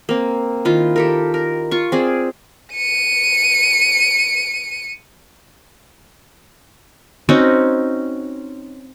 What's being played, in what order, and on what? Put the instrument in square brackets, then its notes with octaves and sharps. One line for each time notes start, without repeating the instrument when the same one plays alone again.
[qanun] A#3 C4
D#3 E4 F4
G4 A4 A#4
A#4
F4 C#6
C4 G#4 D5
[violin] C#7 D#7
[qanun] C4 C#4 D#4 F#4